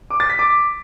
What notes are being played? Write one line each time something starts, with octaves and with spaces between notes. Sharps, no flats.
D6
A6
B6
D6